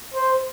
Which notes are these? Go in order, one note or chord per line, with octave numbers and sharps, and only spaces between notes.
C5